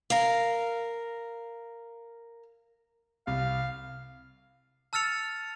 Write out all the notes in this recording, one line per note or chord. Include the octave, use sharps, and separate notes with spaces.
A#4 F5
C2 F5
A5 E6 F6 A6 C#7 F7